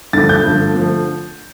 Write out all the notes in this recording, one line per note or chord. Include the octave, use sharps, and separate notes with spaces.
G2 D3 F3 A3 A6
G6
G2 D3 F3 A3
D3 F3 A3